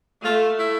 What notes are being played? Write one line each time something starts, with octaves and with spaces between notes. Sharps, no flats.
A3 F4
E4